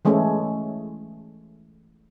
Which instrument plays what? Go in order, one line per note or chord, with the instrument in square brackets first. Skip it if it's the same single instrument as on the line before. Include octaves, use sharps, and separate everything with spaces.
[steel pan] E3 G#3 A3 C#4